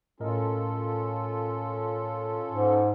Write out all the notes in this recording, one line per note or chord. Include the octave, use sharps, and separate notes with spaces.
A2 C#4 F4 A4 A#4 D#5
G#2